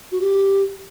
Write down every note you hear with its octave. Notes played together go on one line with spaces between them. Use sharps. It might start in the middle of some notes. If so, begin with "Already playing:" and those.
F#4
G4